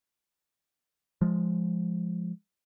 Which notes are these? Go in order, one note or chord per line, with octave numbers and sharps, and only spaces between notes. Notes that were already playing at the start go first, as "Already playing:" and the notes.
F3 G#3